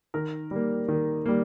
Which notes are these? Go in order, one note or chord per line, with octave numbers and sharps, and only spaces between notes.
D#3 A#4
G3 A#3
D#3
G3 A#3